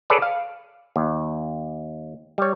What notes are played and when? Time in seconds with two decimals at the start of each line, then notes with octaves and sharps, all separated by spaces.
0.10 G#4 A4 B4 C#5 D5
0.22 F5
0.96 D#2
2.38 G3 C#5